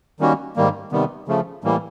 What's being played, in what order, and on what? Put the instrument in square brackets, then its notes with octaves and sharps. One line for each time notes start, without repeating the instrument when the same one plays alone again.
[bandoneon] D#3 G3 A#3 C#4 F#4
G#2 D#3 G3 A#3
C3 D#3 G3 B3
C#3 F3 A3
A2 E3 G3 A#3